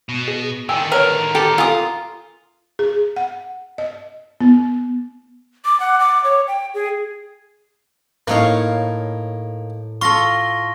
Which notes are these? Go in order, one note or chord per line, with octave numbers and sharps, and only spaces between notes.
B2
G#4
D3 D#3 G5 G#5 E6
A#4 B4 C#5
G4 A4 G5 A#5 A6
F4 A4 G#5 D6 D#6
G#4
F#5
D#5
B3
D6
F#5
D6
C#5
G5
G#4
A2 A#3 D#4 C#5 F5
F4 A4 C6 C#6 A#6 G7